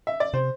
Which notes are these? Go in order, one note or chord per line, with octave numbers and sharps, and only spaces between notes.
E5
D5
C3 C5